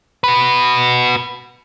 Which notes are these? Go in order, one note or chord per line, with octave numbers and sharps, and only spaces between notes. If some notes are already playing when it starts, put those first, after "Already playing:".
F#4 B4